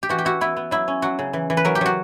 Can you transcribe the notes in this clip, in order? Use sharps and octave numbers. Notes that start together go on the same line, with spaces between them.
G4
E3 F#4
G4
E4 F#4
B3 E4
B3
F#3 E4
C#4
F#3 F#4
C#3
E3
E3
B4
F#3 A#4
G4
F#3 F#4